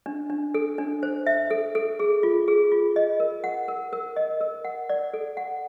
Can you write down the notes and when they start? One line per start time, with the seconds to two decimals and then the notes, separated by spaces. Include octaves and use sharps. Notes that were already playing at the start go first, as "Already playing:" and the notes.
0.06 D4
0.30 D4
0.54 A4
0.78 D4
1.03 C5
1.27 E5
1.51 A4
1.75 A4
1.99 G#4
2.23 F4
2.48 G#4
2.72 F4
2.96 D#5
3.20 A#4
3.44 F#5
3.68 A#4
3.93 A#4
4.16 D#5
4.41 A#4
4.65 F#5
4.89 D5
5.13 A4
5.37 F#5